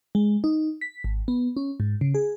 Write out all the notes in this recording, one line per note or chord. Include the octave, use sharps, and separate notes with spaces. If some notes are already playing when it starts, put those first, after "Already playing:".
G#3
D#4
B6
G#1
B3
C#4
G#2
C#3
G#4